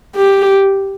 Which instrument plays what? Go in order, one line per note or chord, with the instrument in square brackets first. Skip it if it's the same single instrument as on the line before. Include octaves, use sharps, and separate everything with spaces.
[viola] G4